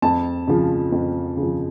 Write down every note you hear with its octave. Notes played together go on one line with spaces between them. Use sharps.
F2 A5
C#3 F3
F2
C#3
F3